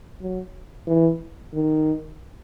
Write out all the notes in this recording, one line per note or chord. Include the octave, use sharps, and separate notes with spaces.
F#3
E3
D#3